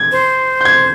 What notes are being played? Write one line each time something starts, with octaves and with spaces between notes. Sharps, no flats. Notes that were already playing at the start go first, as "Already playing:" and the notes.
Already playing: G#6
C5
G6
G#6